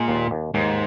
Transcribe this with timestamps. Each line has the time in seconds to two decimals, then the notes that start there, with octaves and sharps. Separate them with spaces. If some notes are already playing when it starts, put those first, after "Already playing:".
Already playing: A#2 G#3
0.08 D#2
0.31 D#2
0.54 D#2 G#2